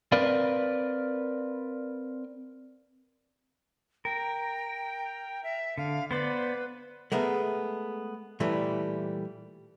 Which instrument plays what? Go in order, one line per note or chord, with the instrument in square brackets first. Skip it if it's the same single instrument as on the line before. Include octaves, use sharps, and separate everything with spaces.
[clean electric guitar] C4 A#4 B4 D5 F5
[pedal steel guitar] A#4 [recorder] G5
[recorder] E5
[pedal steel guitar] D3 [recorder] F5
[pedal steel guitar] B3 C5 D5 [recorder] B4
[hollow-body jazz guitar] G#3 A3 B3 A#4
A#2 E3 G3 A3 A4